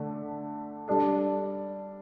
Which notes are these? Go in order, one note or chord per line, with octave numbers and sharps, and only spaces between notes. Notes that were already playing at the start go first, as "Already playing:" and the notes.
Already playing: D3 A3 D4
G3 D4 A4